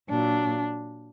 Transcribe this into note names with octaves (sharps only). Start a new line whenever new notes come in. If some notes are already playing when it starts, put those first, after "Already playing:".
A#2 F#3 D4